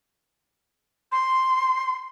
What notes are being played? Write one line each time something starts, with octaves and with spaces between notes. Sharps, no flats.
C6